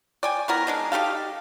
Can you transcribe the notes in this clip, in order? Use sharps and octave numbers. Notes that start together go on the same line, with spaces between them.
D5 G5 G#5
B3 E4 A#4
G#3 D4 D#4
D#4 G4 A4 F5